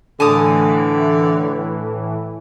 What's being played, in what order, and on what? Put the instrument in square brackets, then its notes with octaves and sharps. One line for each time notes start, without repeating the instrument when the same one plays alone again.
[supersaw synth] A2 E3 [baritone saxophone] D3 [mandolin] G#5 A5 D#6